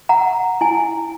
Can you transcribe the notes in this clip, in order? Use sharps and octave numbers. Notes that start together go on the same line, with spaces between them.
F#5 A#5
E4 G#5